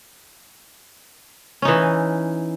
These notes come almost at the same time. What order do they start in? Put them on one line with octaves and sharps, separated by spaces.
C#4 D#4 E3